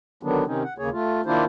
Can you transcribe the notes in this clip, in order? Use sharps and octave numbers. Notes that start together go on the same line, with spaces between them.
D3 D#3 F#3 B3 D4
C3 D#3 C4 C#4 D#4
F#5
D#2 C#3 A#3 G#4 C#5
A3 F4
D#3 A#3 D4 E4 F4 C5